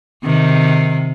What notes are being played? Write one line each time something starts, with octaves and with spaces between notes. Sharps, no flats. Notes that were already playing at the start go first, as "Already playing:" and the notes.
C3 D#3